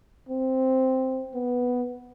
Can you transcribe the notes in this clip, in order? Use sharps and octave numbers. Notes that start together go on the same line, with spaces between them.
C4
B3